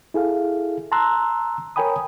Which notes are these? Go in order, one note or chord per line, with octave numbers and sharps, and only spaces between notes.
E4 G#4 A4 F5
A5 A#5 C6 E6 F#6
A#4 C#5 G5 G#5 B5 D#6